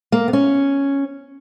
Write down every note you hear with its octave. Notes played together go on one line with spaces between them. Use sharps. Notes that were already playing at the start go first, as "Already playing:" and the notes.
A#3
B3
C#4